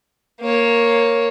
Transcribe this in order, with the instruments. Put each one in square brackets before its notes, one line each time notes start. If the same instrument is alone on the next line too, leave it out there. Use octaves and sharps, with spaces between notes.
[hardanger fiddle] A#3 C#5